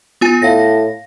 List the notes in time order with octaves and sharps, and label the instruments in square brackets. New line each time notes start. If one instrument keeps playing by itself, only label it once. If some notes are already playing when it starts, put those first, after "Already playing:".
[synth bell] B3 F4 G#5
[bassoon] A2 [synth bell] F5 A#6